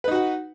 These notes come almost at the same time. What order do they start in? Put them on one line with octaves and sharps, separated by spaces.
B4 D#4 F#4 F#5